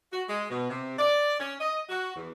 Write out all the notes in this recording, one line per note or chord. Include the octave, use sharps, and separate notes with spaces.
F#4
G#3
B2
C3
D5
C#4
D#5
F#4
E2